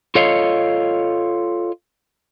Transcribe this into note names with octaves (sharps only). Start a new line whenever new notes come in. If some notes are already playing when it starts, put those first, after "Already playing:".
F4 A4 C#5 D#5 F5